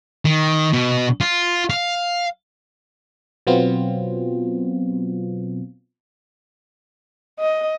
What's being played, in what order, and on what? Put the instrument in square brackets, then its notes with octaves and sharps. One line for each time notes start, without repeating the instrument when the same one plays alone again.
[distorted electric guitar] D#3
B2
F4
F5
[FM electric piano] B2 F#3 B3 C4 F4
[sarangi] D#5